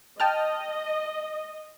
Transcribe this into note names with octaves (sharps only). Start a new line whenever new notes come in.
D#5 G5 A5 F6